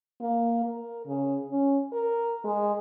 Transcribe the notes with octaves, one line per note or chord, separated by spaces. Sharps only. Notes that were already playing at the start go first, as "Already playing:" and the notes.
A#3
A#4
C#3
C#4
A#4
G#3